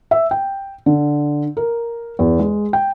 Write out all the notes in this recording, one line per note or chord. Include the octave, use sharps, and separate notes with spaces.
E5
G5
D3
A#4
E2
G#3
G5